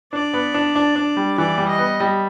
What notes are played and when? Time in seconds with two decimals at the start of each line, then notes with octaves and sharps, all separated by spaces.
0.13 D4 D5
0.33 B3
0.54 D4
0.76 D4
0.96 D4
1.17 G3
1.38 E3 D5
1.58 G3
1.68 D#5
1.79 B3
2.00 G3